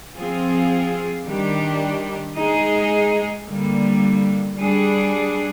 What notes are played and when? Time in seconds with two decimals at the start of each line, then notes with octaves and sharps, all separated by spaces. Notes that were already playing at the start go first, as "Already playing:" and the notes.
0.15 F3 C4 F4 G#4
1.25 D#3 G3 D4 G4
2.36 G#3 D#4 G#4
3.46 D3 G3 A#3
4.56 G3 D4 G#4